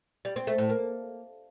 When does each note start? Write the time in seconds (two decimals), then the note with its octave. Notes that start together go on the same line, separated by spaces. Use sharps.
0.25 G3
0.36 C4
0.47 A3
0.58 A2
0.69 A#3